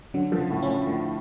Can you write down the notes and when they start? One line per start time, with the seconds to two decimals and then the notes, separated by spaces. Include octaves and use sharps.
0.14 D3 F#3
0.32 F3
0.39 C#3
0.50 A2
0.62 C#4
0.68 A2
0.87 A2 D3